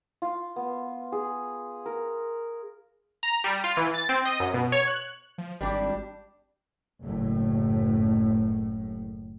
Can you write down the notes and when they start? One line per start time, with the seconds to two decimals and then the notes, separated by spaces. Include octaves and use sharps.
0.22 F4
0.56 B3
1.12 G#4
1.86 A#4
3.23 A#5
3.44 G3
3.64 F4
3.77 E3
3.94 A6
4.09 C4
4.25 D#5
4.40 F#2
4.54 B2
4.72 C#5
4.88 F#6
5.38 F3
5.61 G#1 G3 D4
7.03 F#1 A2